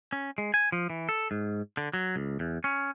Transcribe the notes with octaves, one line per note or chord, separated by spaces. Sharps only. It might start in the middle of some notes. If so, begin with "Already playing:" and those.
C#4
G#3
G#5
F3
E3
A4
G#2
D3
F#3
C#2
E2
C#4